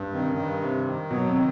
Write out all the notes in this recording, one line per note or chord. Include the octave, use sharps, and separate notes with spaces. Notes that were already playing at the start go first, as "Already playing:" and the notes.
Already playing: G2
C3 D#3
C#3
G2
C3
D#3
B2 F#3
C3
D#3